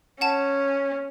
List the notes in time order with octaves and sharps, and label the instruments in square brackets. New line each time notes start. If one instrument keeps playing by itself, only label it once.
[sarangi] C#4 [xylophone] F#5 A5